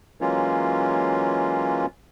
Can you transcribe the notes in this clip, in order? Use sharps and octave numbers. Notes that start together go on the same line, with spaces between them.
E3 F#3 G#3 A#3 C#4 F4